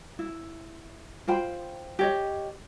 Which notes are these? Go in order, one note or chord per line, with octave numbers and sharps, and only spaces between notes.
E4
F4 C5 G5 B5
G4 C#5 D#5